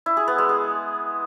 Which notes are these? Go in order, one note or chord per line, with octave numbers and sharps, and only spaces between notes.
E4
G#4
B3
G#3
G#4